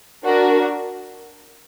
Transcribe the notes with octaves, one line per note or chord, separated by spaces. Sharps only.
D4 F#4 A#4